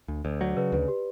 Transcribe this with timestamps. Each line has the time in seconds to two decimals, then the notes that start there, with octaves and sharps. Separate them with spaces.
0.08 D2
0.25 D2
0.40 F#3 D5
0.57 C#3 B4
0.72 D2 B4
0.88 G4